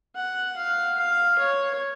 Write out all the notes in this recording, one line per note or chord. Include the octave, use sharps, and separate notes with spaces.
F#5
F5
F5
C#5